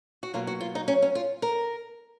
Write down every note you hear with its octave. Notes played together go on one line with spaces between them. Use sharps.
F#4
B2 F#3 A#3 F4
F#4
F4
D#4
C#4
C#4
F4
A#4